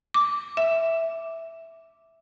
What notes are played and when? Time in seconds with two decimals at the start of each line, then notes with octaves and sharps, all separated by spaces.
0.14 D6
0.57 E5